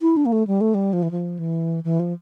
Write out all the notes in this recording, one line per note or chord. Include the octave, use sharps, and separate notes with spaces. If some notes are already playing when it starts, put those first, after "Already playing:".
E4
D4
A#3
A3
G3
A3
G3
F3
E3
F3
E3
E3
F3